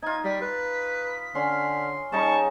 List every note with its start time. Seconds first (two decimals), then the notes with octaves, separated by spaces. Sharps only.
0.03 D#4 F4 G#6
0.24 G3 B6
0.42 B4
1.35 D3 C#4 C6
2.12 C#3 G3 D#4 A5 C#6